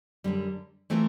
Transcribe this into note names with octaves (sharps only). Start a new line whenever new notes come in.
F#2 D3 G3
E3 A3 C4 F4 A#4